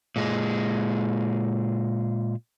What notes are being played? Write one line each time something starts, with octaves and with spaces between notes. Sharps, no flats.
A#2 G#3